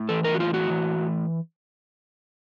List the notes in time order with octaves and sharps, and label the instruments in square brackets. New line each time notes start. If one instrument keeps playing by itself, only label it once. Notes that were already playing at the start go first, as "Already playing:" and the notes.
Already playing: [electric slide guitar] A2
E3 A4
A#4
F#4
A2 F4
F#4
E3
A2